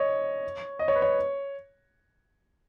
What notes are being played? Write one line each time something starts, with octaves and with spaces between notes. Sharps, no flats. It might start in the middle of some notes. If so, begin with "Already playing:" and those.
Already playing: C#5 D#5
D#5
C#5
B4
C#5